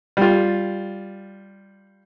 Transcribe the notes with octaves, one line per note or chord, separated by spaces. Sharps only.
G3 F4